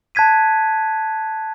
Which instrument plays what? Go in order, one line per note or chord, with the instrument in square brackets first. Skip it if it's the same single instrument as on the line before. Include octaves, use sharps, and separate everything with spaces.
[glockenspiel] A5 F#6 G#6 B6 D#7